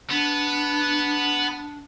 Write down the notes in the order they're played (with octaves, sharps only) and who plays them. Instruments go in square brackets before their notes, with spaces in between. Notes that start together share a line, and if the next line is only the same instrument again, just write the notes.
[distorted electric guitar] B3 [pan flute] D4